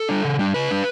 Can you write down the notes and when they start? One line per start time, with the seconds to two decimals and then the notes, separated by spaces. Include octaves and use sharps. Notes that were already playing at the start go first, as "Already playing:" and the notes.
Already playing: A4
0.09 G3 D4
0.24 C#3
0.39 G3 D4
0.54 C#3 B4
0.71 G3 D4